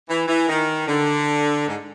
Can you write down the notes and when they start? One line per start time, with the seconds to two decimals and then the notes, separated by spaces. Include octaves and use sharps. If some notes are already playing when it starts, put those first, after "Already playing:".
0.09 E3
0.28 E3
0.49 D#3
0.87 D3
1.67 G#2